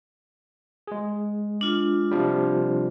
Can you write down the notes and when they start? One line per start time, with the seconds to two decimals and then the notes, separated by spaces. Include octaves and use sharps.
0.87 G#3 G#4
1.61 D4 F4
2.11 C3 F3 G3